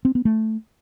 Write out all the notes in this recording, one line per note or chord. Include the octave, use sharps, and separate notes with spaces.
C4
B3
A3